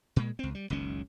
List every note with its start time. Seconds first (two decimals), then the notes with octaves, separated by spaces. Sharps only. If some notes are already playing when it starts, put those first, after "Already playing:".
0.16 A#2 G#3
0.39 C#2 C4
0.55 G3
0.70 F#1 C#2 D#3 C#4